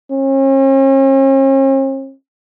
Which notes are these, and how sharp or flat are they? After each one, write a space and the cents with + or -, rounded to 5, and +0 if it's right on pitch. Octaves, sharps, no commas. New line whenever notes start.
C#4 -45